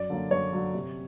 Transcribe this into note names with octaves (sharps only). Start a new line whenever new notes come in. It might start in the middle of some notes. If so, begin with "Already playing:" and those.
Already playing: F#2 D5
D3 F#3 A#3
F#2 C#5
D3 F#3 A#3
C3